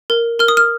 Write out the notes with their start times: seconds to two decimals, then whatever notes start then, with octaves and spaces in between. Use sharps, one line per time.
0.10 A#4
0.39 A#4 F6
0.48 D#6
0.57 F6